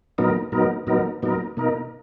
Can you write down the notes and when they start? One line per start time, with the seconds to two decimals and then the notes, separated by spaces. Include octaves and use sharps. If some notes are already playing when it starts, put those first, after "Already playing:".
0.18 A#2 F#3 B3 D#4 A#4
0.52 A#2 F#3 B3 D#4 A#4
0.87 A#2 F#3 B3 D#4 A#4
1.23 A#2 F#3 B3 D#4 A#4
1.57 B2 A#3 D#4 A#4